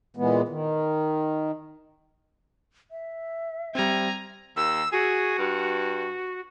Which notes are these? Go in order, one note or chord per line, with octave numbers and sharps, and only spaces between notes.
A#2 E3 G#3 B3
D#3
E5
G3 C4 G#5 A#5
D#2 E6
F#4 G#4
G2